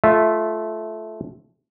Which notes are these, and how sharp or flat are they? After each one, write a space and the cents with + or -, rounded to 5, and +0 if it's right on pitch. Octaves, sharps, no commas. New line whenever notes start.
A3 -15 F4 +0 E5 +0